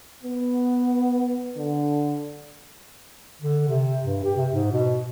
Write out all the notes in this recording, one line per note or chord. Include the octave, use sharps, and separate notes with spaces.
B3
D3
D3
C3
G2
G4
C3
G#2
B2